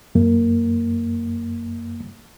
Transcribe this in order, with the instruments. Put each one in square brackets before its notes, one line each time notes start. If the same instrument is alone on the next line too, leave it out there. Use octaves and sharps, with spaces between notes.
[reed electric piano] F#2 A#3